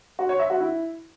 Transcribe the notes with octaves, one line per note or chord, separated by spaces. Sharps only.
F#4
C#5
E5
F#4
E4